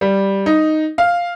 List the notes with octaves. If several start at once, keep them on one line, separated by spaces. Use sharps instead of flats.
G3
D#4
F5